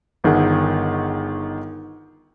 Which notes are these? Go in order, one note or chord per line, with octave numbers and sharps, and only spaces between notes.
G1 D#3 G#4 F#5